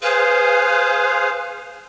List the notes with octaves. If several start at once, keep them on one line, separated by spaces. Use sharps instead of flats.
G#4 B4 C5 F5